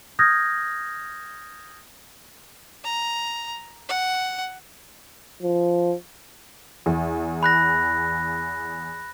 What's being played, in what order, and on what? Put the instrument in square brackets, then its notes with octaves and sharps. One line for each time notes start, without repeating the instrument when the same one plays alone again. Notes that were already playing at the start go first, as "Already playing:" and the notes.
[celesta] D#6 F6 G6 G#6 A#6
[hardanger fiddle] A#5
F#5
[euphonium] F3
[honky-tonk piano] E2
[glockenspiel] B5 F#6 A#6